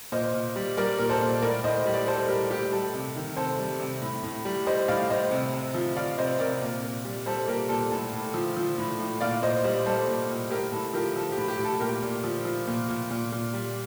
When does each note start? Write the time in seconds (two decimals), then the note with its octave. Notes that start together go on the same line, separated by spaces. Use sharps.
0.12 A#2 C5 D#5
0.34 A#2
0.56 G3
0.77 G3 A#4 D5
0.98 A#2 A#4
1.10 A4 C5
1.21 A#2
1.42 A2 A#4 D5
1.64 A2 C5 D#5
1.80 D#5
1.86 G3
1.94 D5
2.07 G3 A4 C5
2.28 A2 G4 A#4
2.50 A2 G4
2.72 G3 A4
2.94 C3
3.16 D#3
3.37 C3 A4 C5
3.59 G3
3.80 C3
4.02 A2
4.23 A2
4.45 G3
4.67 G3 C5 D#5
4.88 A2 D5 F5
5.10 A2 C5 D#5
5.31 C3
5.53 C3
5.74 F3
5.96 F3 D5 F5
6.18 C3 C5 D#5
6.40 C3 A#4 D5
6.62 A#2
6.84 A#2
7.05 G3
7.26 G3 A4 C5
7.48 A#2 G4 A#4
7.69 A#2 A4
7.91 A2 A4
8.13 A2
8.34 F3
8.57 F3
8.78 A2
8.99 A2
9.21 A#2 D5 F5
9.42 A#2 C5 D#5
9.64 G3 C5 D#5
9.86 G3 A4 C5
10.07 A#2
10.29 A#2
10.50 A2 G4 A#4
10.72 A2 A4
10.93 F3 G4 A#4
11.16 F3 A4
11.32 G4
11.38 A2
11.48 G4
11.59 A2
11.65 A4
11.80 A#2 G4 A#4
12.02 A#2
12.24 F3
12.45 F3
12.67 A#2
12.88 A#2
13.11 A#2
13.32 A#2
13.53 G3